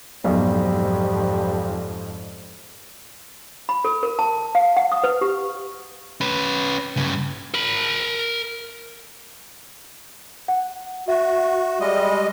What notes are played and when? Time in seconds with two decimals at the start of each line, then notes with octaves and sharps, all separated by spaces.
0.24 B1 F2 G#2 G3
3.69 B5
3.85 A4
4.03 A#4
4.19 A5
4.55 F5
4.77 F#5
4.92 D#6
5.04 B4
5.21 G4
6.21 C#4 B4
6.96 G2 C#3
7.54 A#4 B5
10.48 F#5
11.08 F#4 E5
11.80 G3 G#3 D#5